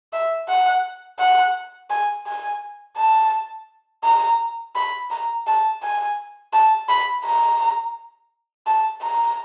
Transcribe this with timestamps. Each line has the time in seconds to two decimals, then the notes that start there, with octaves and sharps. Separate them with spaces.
0.13 E5
0.48 F#5
1.19 F#5
1.90 G#5
2.26 G#5
2.97 A5
4.04 A#5
4.75 B5
5.11 A#5
5.47 A5
5.82 G#5
6.53 A5
6.89 B5
7.24 A#5
8.66 A5
9.02 A#5